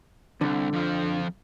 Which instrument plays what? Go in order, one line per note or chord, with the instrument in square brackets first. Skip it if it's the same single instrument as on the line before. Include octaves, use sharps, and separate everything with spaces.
[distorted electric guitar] C2 [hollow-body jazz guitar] D3
[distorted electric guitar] F2 F3